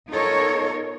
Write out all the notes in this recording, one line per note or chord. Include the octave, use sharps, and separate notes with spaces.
B3 D#4 F4 A4 A#4 C#5